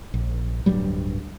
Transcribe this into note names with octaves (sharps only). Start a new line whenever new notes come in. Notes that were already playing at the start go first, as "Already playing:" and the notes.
A#1
D1 G2 F#3 G3